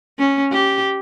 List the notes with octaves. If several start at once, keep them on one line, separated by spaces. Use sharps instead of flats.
C#4
G4